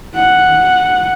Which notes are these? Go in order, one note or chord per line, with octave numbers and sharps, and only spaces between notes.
F#5